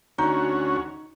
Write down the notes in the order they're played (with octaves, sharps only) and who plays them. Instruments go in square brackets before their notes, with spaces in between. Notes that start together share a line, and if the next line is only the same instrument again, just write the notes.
[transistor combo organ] D2 C#4 F#4 [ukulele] D#4